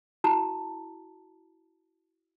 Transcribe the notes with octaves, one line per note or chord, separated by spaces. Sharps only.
E4 F#4 A5 A#5